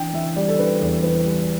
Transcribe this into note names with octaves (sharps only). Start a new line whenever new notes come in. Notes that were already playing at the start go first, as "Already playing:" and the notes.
Already playing: E3 D4 G5
E3 E5
G3 D5
A4
D4 B4
E2
E3 B4
G3